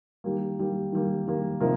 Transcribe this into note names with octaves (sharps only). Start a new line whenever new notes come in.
D#3 G3 A#3
D#3 G3 A#3
D#3 G3 A#3
D#3 G3 A#3
C3 F3 A#3 D#4 A#4